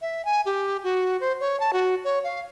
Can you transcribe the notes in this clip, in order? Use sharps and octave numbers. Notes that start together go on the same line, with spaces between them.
E5
G#5
G4
F#4
C5
C#5
A5
F#4
C#5
F5